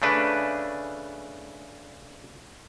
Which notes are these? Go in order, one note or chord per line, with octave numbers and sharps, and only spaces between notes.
C#3 A3 D4 B4